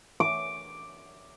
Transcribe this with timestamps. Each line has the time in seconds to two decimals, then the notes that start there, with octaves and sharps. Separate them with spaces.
0.20 D6